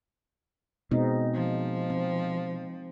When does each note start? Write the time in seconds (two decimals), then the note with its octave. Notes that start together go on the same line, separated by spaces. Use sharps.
0.91 B2 G#3 C4 D#4
1.34 F3
1.90 C4